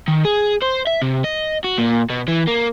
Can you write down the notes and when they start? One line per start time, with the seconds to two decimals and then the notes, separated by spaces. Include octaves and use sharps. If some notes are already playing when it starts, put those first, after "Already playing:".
0.08 D#3
0.25 G#4
0.63 C5
0.87 E5
1.02 C3
1.24 D#5
1.64 F#4
1.78 A#2
2.10 B2
2.28 E3
2.47 A#3